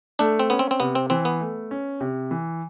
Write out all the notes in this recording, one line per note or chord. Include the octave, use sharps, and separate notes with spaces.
A3 D4
C4
B3 C#4
C4
C4
C3 B3
C4
E3 C4
B3
A3
C#4
C3
E3